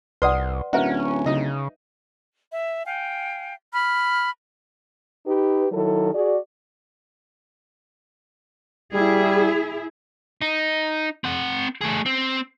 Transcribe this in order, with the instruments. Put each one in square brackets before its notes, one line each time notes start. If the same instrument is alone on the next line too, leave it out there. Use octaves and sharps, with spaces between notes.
[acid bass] C2 [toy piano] B4 D5 F#5 [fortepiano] C6 D#6
[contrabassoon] D1 [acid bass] C#4 [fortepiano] F#4 A#4 [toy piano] B4 E5 F5
[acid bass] C#3 [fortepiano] D#4 D#5
[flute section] E5
F5 G5 G#5
B5 F6
[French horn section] D#4 G4 B4
D#3 F#3 E4 A4
F#4 G#4 D5
[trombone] G3 [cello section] E4 G#4
[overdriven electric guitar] D#4
C4 F#5
A3 G#4
C4